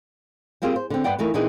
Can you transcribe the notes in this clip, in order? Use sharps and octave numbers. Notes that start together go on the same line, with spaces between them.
G3 A#3 C4 F4 G4 G#4
C5
D3 C4
G2 B3 B4 D5 F#5 G5
F2 E3 A3 D#4 A#4
A#2 E3 C4 D4 D#4 G#4